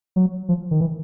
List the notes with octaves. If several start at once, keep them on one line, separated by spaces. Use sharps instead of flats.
F#3
F3
D#3
E3